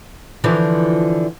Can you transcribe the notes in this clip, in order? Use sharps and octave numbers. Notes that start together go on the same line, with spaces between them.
D3 E3 F3